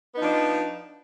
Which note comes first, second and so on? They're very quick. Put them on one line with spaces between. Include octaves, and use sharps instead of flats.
B3 D#4 F3 D4